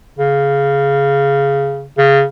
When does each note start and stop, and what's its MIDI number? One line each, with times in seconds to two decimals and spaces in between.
0.19 1.87 49
1.98 2.23 49